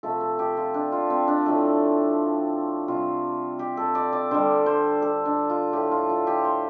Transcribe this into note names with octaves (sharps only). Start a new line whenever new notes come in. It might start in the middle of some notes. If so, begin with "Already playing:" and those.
C3 F3 A3 A4
A4
G4
F4
D4
F4
C4
D4
A2 F3 A3
C3 G3 F4
G4
A4
D5
D5
D3 G3 C5
C5
A4
D4
F4
A2 F3 A3 G4
F4
F4
G4
C5